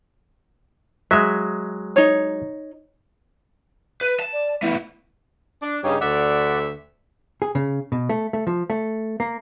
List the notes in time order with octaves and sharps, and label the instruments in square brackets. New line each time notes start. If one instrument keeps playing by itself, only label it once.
[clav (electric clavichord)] F#3 G#3 [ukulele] E5
[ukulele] D#4 C#5
[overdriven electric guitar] B4
A5
[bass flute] D5
[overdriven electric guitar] A3 B3 [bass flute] E4
[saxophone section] D4
[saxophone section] G2 C#3 [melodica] D#4 G4 C#5
[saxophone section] D2 D3 E5 [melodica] D5 F#5
[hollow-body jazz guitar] G#4
C#3
B2
A3
A3
F3
A3
A#3